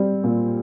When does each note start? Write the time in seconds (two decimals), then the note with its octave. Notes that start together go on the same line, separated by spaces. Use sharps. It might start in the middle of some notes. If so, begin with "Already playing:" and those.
Already playing: G3 C4
0.24 A#2